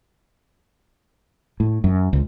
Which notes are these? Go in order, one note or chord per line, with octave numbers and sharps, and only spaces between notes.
A2
F#2
C#2